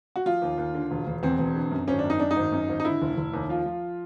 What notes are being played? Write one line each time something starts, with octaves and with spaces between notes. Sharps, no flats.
F#4
F3 F4
D#2
D#2
D3
E1
E1
E2 C4
E1
D3
F#2
G#1 C#4
D4
F#2
D#4
F#2 D4
D#4
G#1
F#2
G#1
D#4
D3 E4
F1
F1
D#2
F3 F4
F3